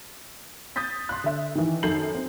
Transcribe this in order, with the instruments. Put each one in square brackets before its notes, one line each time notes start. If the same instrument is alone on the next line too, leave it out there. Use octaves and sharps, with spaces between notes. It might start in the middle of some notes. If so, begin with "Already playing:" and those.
[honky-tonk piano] D#6 G6 A6 B6
C6 F#6
D3 E5
D#3 E3
F#2 D#3 A4 G6 C7 F#7
C4